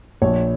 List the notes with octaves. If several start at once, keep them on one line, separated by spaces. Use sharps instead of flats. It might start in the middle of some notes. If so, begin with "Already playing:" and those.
A#1 C#5